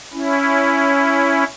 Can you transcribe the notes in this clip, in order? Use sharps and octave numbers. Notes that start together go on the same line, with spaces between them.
C#4 E4